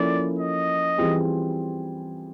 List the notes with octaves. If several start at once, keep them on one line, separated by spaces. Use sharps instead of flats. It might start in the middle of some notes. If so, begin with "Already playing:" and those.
Already playing: F3 A#3 C#4 E4 A4 D5
D#5
E3 G3 C4 F4 G#4